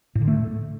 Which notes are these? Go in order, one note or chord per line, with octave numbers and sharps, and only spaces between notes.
A2
D3
A3